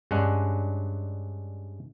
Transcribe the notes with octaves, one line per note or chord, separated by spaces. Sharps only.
G2 G#3 C#4 D4 F#5